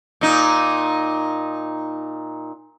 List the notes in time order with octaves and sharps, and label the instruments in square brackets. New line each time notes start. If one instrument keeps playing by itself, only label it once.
[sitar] A#2 D#4